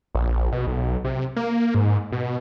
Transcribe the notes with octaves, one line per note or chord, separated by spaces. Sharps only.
A#1
B2
B1
C3
A#3
G#2
B2